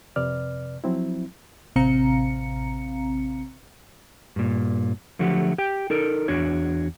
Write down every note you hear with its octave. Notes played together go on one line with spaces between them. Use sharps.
F2 C3 B4 D5 F6
F3 F#3 C4 E4
A1 C3 C4 F5 A#5 C#7
G2 A#2
D3 F3 F#3 A3 F#4 G4
G4 G5
D#4 A4 A#4
E2 D4 F#4 C#5